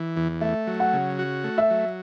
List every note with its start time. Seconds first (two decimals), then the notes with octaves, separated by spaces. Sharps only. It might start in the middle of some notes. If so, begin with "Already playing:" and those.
Already playing: E3
0.16 E2
0.41 A3 E5
0.67 F#3
0.80 F#5
0.93 C#3
1.19 F#4
1.44 A3
1.58 E5
1.70 F#3